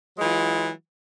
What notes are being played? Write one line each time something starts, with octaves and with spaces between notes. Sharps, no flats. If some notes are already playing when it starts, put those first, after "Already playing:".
E3 F#3 G#3 F4